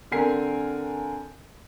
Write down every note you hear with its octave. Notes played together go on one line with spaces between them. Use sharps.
D3 C4 A#4 G#5 C7